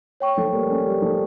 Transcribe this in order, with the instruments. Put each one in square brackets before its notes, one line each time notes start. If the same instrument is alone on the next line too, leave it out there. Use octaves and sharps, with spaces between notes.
[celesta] C#5 G5 C#6
[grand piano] F3 A3
G3 A#3
A3 C#4
G3 A#3
F3 A3